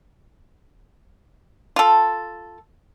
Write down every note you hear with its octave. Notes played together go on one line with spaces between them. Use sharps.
F4 A4